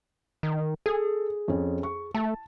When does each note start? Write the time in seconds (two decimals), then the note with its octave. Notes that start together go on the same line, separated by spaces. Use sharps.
0.43 D#3
0.86 G#4 A4
1.48 F2 C#4
1.83 C#6
2.15 A3 A5